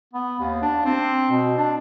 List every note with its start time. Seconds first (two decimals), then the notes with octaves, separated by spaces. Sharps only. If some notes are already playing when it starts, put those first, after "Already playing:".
0.13 B3
0.40 D#2
0.62 D4
0.85 C4
1.31 B2
1.57 D4